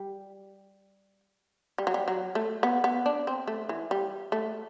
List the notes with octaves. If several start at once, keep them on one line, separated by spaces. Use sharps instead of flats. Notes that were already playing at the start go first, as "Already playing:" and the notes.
Already playing: G3
G3
F#3
G3
F#3
A3
B3
B3
D4
C4
A3
E3
G3
A3